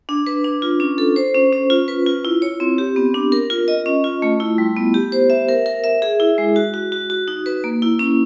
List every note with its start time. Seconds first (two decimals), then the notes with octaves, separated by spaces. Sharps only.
0.09 D4
0.27 B4
0.44 D4
0.62 F4
0.80 C#4
0.98 A4
1.16 C5
1.35 C#4
1.53 C#4
1.70 F4
1.88 B4
2.06 F4
2.25 E4
2.42 C#5
2.60 C4
2.78 G4
2.96 B3
3.14 D4
3.32 A#4
3.50 F4
3.68 D#5
3.86 C#4
4.04 F4
4.22 A3
4.40 E4
4.58 G3
4.76 B3
4.94 G4
5.12 C5
5.30 E5
5.48 A#4
5.66 A#4
5.84 E5
6.02 G#4
6.20 E4
6.38 G#3
6.56 F#4
6.74 F#4
6.92 F#4
7.10 F#4
7.28 D#4
7.46 B4
7.64 A#3
7.82 E4
7.99 C#4